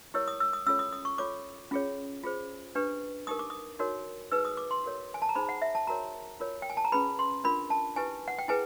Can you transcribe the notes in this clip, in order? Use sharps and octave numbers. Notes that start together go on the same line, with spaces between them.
E4 G4 A#4 C#5 E6
D#6
E6
D#6
C#4 F4 A4 C#5 E6
D#6
D#6
C#6
F4 A4 C#5 D6
C#4 F4 G#4 C#5
F4 G#4 C5
D4 G4 B4
D#4 G4 A#4 D#6
D6
D#6
D#4 F#4 A#4 C#5
D#4 G#4 B4 E6
D#6
D6
C6
F#4 A#4 C#5
G#5
A5
A#5
D#4 G#4 C5 B5
F#5
E5
A5
F#4 A#4 C#5 A#5
F4 A#4 C#5
G5
G#5
A5
A#5
C#4 F4 G#4 B4 B5
C6
D4 F4 A#4 B5
A5
E4 G4 B4 G#5
F#5
G5
E4 G#4 B4 G#5